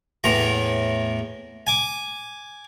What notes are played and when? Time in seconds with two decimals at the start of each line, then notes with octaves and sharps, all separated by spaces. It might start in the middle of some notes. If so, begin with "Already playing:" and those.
0.24 E2 A2 A#5
1.67 G#5 D6